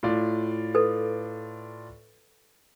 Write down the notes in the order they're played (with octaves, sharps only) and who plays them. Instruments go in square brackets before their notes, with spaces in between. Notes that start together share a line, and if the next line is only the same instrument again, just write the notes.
[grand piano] A2 F4 D5
[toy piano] A4 B4